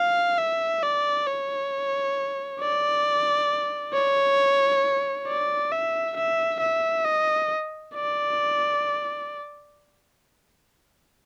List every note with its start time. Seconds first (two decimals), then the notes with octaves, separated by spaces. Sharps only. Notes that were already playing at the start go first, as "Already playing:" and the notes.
Already playing: F5
0.38 E5
0.83 D5
1.27 C#5
2.60 D5
3.93 C#5
5.28 D5
5.71 E5
6.17 E5
6.60 E5
7.05 D#5
7.95 D5